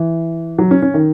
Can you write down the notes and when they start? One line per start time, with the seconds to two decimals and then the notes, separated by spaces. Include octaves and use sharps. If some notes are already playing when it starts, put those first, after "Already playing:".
Already playing: E3
0.59 F#3
0.71 C#4
0.82 C#4
0.94 D#3